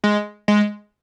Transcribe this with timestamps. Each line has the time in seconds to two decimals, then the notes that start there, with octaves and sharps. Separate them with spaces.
0.04 G#3
0.48 G#3